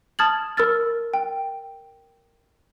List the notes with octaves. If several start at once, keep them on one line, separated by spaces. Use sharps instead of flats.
A5 D#6 F6 G#6 A6 F#7
A#4 E6 F6 A6
G5